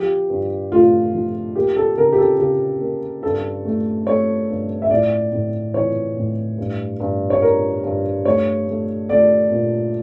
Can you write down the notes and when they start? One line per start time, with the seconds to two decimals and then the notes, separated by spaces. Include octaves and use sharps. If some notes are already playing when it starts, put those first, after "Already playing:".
Already playing: F3 G4
0.30 G2
0.72 A3 F4
1.14 F3
1.55 A#3 G4
1.76 A4
1.97 C#3 A#4
2.13 G4
2.18 A4
2.39 C#3 G4
2.81 A#3
3.23 G2 A4
3.65 A3
4.07 A3 C#5
4.49 G2
4.82 E5
4.90 A2 D5
5.32 A2
5.74 E3 C#5
6.17 A2
6.58 G2
7.00 G2
7.30 C#5
7.42 G2 A#4
7.83 G2
8.25 A3 C#5
8.68 A3
9.09 A3 D5
9.51 A#2